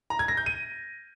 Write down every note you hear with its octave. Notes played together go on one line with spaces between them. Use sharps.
A#5
G#6
A#6
G6
D#7